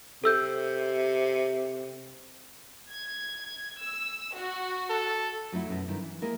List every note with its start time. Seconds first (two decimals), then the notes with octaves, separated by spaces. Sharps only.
0.24 C3 A4 E6 G6
2.91 G#6
3.81 E6
4.37 F#4
4.90 A4
5.52 F#3 A3 D#4 E4 F#4
5.67 F#2 B2
5.88 G2 D#3 E4
6.01 E3
6.22 G#3 A#3 E4 A#4